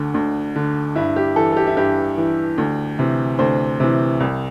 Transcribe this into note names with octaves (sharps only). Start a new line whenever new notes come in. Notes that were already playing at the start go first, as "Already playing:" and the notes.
Already playing: D2 D3
D2
D3
G2 E4
G4
E3 A4
A4
G4
E4
G2 G4
E3
D2
C3 E3
D2 C5
C3 E3
C2